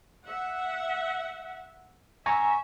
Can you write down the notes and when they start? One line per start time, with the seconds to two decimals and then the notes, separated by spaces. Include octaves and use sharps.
0.24 E5 F#5
2.26 E5 G#5 A#5 C#6